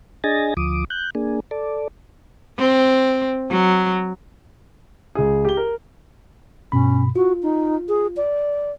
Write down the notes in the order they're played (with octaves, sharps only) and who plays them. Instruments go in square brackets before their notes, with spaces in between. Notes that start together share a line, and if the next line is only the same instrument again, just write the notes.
[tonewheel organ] D4 G#4 D#5 G#5 A6 A#6
D2 F3 D6 D#6
F#6 G6
A#3 D4 G#4
A4 D5
[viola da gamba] C4
F#3
[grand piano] C#2 G#4
G4 G7
A#4
[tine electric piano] G2 B2 B5 [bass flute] C#4
[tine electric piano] F4 [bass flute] F#4
[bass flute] D#4
G#4
D5